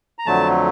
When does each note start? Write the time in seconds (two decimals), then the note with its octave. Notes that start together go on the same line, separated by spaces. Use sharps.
0.19 A#5
0.26 F2 D3 F#3 A3 A5